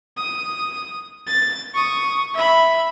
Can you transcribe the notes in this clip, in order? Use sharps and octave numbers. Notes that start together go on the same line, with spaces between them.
D#6
A6
C#6 D#6
E5 B5